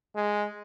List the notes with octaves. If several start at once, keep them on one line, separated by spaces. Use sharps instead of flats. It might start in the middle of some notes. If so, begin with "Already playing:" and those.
G#3